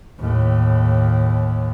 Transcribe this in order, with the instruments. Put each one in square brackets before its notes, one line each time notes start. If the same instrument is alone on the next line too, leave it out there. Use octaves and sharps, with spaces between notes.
[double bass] D#2 A2